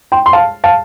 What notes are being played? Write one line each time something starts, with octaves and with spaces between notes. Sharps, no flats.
G5 C6
C6
F5 A5
F5 A5